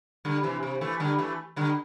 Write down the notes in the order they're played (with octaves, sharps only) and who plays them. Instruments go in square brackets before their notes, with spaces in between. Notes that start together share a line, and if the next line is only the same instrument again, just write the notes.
[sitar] D3 G3
C3 E3
C3
E3 A3
D3 G3
E3 A3
D3 G3